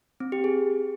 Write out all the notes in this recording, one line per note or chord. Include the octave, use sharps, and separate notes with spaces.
C4
G4
G#4